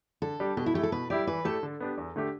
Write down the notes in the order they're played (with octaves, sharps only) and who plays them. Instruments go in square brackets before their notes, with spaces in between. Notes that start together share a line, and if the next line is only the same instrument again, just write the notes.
[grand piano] D3 [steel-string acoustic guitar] A4
[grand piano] G3 D4 G4
[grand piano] B2 [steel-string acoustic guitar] G4
[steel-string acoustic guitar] E4
[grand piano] A3 [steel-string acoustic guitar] G4
[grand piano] E4
[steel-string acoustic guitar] A4
[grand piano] B2 [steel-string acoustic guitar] B4
[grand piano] G3 E4 G4 [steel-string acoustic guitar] D5
[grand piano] E3 [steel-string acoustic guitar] B4
[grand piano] A3 E4 G4 [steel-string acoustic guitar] A4
[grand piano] D3
B3 D4 G4
E2
D3 A3 D4 G4